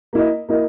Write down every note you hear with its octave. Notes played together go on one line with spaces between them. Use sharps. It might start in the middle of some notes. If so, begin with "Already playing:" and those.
A#3 E4 A#4 D#5
A#3 E4 A#4 D#5